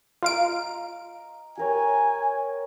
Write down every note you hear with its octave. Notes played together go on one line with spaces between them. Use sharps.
F4 D#5 F5 A#5 D7
G4 A#4 C#5 G#5